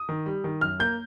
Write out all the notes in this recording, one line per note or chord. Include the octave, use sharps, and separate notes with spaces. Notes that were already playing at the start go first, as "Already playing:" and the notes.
Already playing: D#6
D#3
G3
D#3
F#2 F6
A#3 G6